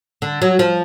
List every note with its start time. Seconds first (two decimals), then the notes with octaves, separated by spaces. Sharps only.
0.22 D3
0.42 F#3
0.59 F3